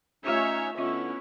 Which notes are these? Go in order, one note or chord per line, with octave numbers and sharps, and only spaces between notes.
A3 C#4 D#4 F4 G4 C#5 E5
D3 B3 C#4 E4 F4 D#5 E5